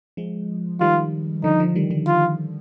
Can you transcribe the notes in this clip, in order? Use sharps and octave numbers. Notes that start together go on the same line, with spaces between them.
F3 G#3
D#3 G3 F4
D3 F3 D#4
D3 F3
D#3 G3
D#3 G3
F4